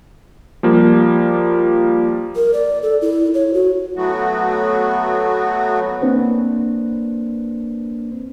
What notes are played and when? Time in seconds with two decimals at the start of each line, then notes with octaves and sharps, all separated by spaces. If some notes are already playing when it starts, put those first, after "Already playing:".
0.63 F3 G3 A#3 F4
2.36 A#4
2.53 D5
2.83 A4
3.02 E4
3.34 C#5
3.54 F#4
3.96 F#3 A3 B3 F#4
6.01 A#3 C4 D4 B4 C5